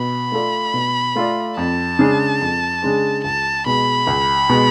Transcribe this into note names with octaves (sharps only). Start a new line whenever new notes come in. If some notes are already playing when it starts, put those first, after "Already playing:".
Already playing: B2 B5
A3 F4 A4 D5
B2
A3 F4 A4 D5
F2 A5
C#3 G#3 D4 G#4
F2
C#3 G#3 D4 G#4
C#2 A5
B2 G#3 B5
C#2
B2 G#3